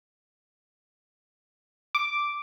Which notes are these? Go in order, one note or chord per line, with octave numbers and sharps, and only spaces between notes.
D6